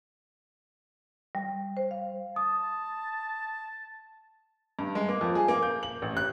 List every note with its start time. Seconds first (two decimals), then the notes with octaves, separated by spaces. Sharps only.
1.35 G3
1.77 C5
1.91 F5
2.36 A5 D#6
4.79 G2
4.95 G#3
5.09 A#3
5.21 F2
5.35 G#4
5.48 A#3
5.63 G6
5.83 F#7
6.02 A1
6.17 F#6